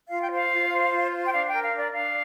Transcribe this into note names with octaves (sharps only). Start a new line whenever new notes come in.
F4 F5
G5
C5 F5
F4
C5
F4
C5
G5
D4 F5
A#4 G5
F5
D4
D5
D4 F5